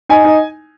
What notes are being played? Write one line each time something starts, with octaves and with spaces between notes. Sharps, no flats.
D#4 G#5
D#4